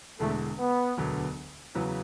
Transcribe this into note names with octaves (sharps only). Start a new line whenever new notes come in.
E1 E2 D3 G#3 A3
B3
E1 D2 D3 F#3 B3
E2 C#3 F#3 B3